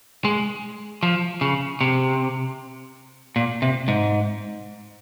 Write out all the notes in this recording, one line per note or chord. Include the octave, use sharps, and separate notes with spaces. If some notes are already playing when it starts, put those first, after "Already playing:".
G#3
F3
C#3
C3
A#2
C3
G#2